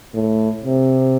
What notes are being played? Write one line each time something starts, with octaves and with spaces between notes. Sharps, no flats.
A2
C3